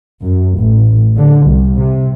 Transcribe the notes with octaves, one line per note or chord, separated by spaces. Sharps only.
F#2
A1
D3
C2
C3